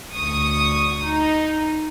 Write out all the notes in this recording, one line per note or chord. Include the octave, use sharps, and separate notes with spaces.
D2 C#6 D#6
D#4